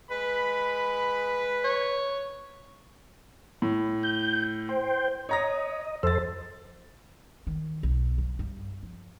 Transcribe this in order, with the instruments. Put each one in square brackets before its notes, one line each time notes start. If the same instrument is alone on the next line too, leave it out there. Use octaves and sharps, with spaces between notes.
[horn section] G#3 B5 [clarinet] B4
[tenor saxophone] C#5
[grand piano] A2
[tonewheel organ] G6
C5 G5
[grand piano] C#5 A#5 A#6 [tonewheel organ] D#5
[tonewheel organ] F2 A4 C5 [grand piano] E6 A6
[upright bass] D#3
B1
F#3
G2
F3